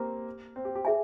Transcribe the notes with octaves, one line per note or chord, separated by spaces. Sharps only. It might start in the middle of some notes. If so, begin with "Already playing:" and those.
Already playing: A#3 C4 G4
C4
G4
G4
G#4 E5 G#5